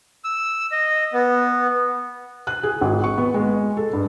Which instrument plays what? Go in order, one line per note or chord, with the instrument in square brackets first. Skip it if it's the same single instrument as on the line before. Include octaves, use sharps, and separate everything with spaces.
[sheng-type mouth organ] E6
D#5
B3
[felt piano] F#6
G#4
G#1
C#6
B3
G#3
A4
G2